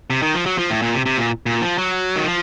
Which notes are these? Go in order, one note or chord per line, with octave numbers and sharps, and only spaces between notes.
C3
D#3
F3
F#3
F3
A2
A#2
C3
C3
A#2
A#2
F3
F#3
D#3
F3